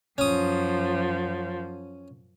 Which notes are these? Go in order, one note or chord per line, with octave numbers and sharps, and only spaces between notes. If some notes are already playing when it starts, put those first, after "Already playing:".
F#2 F3 C#4 D#6